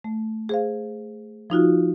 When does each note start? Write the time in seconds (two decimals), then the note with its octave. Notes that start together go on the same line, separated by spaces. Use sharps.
0.04 A3
0.49 G#4 C5 F5
1.50 F3 D#4 F4 F#4